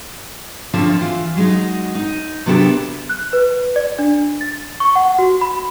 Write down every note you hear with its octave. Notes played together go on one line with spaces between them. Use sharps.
D3 F3 C4 F4 C#5 E5
E3 F4
F#3 G#3 D#4
D#4
C3 F#3 B3 D4 G4 A4
F#6
B4
D5
D4
A6
C#6
F#5
F#4
B5